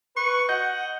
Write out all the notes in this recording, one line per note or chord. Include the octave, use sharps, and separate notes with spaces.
B4 C#6
D#5 F#5 G6